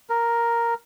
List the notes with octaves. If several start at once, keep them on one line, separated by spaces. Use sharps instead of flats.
A#4